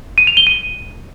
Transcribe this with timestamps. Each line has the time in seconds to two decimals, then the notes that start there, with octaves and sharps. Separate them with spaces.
0.18 D#7
0.27 F7
0.37 G7
0.47 D#7